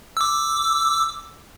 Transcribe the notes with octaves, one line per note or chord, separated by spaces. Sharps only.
D6 E6